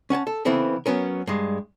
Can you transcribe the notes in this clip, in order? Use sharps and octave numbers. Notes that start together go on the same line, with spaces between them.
C#4 F#5 G#5 A5
A4
C#3 E3 B3 C4 E4 A4
F#3 B3 C#4 A#4
G2 G#3